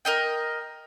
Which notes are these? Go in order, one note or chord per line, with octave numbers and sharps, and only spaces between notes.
A#4 D#5 G5